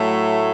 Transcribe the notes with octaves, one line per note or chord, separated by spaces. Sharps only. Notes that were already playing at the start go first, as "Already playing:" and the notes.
Already playing: A2 F#3 A3